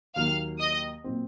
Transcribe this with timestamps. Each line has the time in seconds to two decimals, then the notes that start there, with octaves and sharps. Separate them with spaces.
0.15 D#2 D#3 F#3 A#3 F5 F6
0.59 D#5 D#6
1.04 A#2 F#3 C4